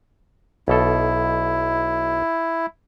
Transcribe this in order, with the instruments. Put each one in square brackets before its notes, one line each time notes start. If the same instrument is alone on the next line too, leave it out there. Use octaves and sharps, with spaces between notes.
[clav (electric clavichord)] B1 B2 A4 [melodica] E4